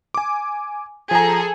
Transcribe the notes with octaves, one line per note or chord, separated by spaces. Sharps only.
G#5 D6
F3 G#4 A4 C5 A#5